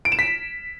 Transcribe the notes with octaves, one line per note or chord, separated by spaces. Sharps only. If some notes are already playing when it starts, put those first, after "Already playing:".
D7
E7
B6